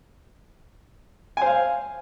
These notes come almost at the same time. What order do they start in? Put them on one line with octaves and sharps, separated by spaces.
G#5 C5 F5